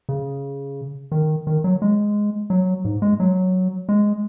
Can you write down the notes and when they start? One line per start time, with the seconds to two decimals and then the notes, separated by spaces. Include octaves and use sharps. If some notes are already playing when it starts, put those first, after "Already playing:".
0.09 C#3
1.12 D#3
1.47 D#3
1.64 F#3
1.82 G#3
2.50 F#3
2.85 G#2
3.02 G#3
3.20 F#3
3.89 G#3